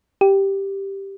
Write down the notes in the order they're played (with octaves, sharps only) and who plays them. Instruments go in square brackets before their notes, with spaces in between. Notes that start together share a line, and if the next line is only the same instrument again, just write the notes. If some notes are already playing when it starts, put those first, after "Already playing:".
[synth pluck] G4